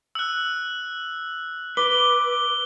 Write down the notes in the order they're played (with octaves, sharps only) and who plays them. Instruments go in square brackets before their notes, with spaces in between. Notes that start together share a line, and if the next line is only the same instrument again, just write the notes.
[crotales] E6 F#6
[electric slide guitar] B4 [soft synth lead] D6 [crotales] G7